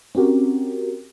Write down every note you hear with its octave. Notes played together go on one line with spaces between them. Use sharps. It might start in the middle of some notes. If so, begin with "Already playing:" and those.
C4 C#4 F#4 G4 A#4